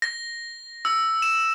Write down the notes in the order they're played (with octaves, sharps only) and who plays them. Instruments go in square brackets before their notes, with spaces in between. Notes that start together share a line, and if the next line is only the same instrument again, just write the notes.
[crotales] A#6
E6
E7